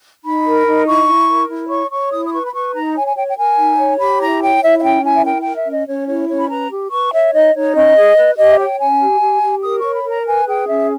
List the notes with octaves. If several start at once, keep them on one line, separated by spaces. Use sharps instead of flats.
D#4 B5
A#4
D#4
E4 C#6
E4
A#4
E4
C#5 C#6
C#5 C#6
E4 D#6
D#6
B4 C#6
B5
B4 C#6
D#4 A#5
C#5 G#5
G#5
C#5 G5
G5
A#4 G#5
D#4
C#5
G4 B5
E4 A#5
C#5 G5
E4 E5
E5
C#4 G5
E4 G#5
E5
A#4 G5
G5
A#4
E5
C#4
D#5
C#4 C#5
E4 C#5
C#4 C#5
B5
B4 A#5
G4
B4 C#6
C#5 E5
D#4 D#5
D#4 C#5
C#4 D#5
G#4
B4
G4 D#5
E5
C#5 G5
C#4 G#5
G4
G4
G4
A#4 D#6
C#5 C#6
B5
A#4 A#5
B4 G#5
G#4 G5
C#4 E5